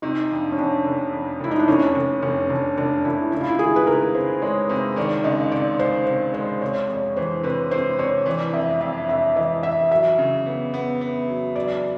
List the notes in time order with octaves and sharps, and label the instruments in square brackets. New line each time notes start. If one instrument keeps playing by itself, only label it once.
[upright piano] C3 [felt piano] D#4
[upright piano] F2 [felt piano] D4
[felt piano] C#4
[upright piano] F2 [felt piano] D4
[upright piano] F1
F2
[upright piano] F1 [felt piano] E4
[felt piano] D#4
D4
[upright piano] F1 [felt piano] C#4
[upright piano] F1
[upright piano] F1 [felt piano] C#4
[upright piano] F1 [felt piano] D4
[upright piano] F1 [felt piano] D4
[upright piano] F1 [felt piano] E4
[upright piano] C#2 [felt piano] E4
[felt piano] F4
E4
[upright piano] D#3 [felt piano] G#4
[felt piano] B4
[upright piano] C#2 [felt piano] A#4
[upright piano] C3 [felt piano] C5
[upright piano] G#3 [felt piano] C#5
[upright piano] C3 [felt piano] C5
[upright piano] D#3 [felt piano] D5
[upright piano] C#2 [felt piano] D#5
[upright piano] C3 [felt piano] D5
[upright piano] C#2 [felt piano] C5
[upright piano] C3 [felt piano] C5
[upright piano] G#3 [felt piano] C5
[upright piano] C3 [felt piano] C#5
[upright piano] F2 [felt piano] C#5
[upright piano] E3 [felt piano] C5
[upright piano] C3 [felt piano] B4
[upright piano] C3 [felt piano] C5
[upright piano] C3 [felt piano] C#5
[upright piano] E3 [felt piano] D5
[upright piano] F2 [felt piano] E5
[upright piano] F2 [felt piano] E5
[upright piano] C3 [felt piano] E5
[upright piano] E3 [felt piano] D#5
[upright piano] E3 [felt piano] E5
[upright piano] F#3 [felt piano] E5
[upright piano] C#3
B3
B3
B3
F#3
[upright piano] F#3 [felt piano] D5